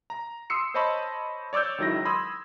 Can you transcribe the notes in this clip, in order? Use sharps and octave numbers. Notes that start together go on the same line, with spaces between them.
A#5
C6 D#6 E6 C7 C#7
C5 C#5 D#5 A5 B5 C#6
C#5 D5 D6 E6 G6
C#2 D#3 F#3 E4 A#6
B5 C6 D#6 E6 G#6